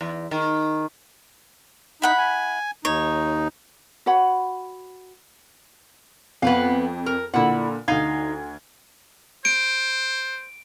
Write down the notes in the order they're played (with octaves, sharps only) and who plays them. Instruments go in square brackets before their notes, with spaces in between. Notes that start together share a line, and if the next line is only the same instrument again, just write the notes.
[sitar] E2
D#3
[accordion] D#4 [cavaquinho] E4 F#5 B5
[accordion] G#5
[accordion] D#2 D#4 [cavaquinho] C#5
[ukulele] F#4 C#5 F#5 B5
[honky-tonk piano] F2 [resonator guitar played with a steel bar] B3 B4 F5
[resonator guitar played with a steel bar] A#4
[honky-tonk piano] A#2 D3 [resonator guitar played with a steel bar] E4 F#5
[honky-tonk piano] D2 G#6 [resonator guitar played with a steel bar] D#4 F5
[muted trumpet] C5 [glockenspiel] D7